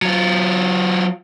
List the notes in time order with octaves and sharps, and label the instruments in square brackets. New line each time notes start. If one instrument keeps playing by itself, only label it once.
[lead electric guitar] F#3 F4